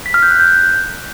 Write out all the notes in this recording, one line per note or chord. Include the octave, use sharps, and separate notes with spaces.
B6
F6
G6
F#6
G6